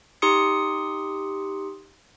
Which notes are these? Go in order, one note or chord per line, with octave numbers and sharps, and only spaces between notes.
D#4 G4 C6 D#6 C#7